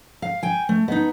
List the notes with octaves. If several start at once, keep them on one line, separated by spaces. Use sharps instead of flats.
F5
G5 G#5
A3
B3 D#4